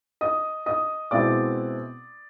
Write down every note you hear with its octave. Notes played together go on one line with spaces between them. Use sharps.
D#5 D#6
D#5 D#6
B2 G#3 C4 E4 D5 D6